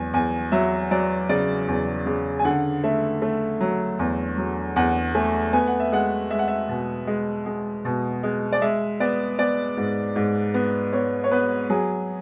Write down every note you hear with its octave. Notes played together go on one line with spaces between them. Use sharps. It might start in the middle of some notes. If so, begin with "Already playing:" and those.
Already playing: E2 F#3 G#5
E2 G#5
F#3 E5
F#3 D5
C#3 D5
E2
C#3
G#5
D3 F#5
A3 E5
A3
F#3
E2
F#3
E2 F#5
A3 G#5
B3 G#5
F#5
E5
G#3 F#5
G#3 E5
F#5
E5
B2
G#3
G#3
B2
G#3
D5
G#3 E5
B3 D5
B3 D5
G#2
G#2
B3
B3 C#5
C#5
B3 B4
F#3 G#4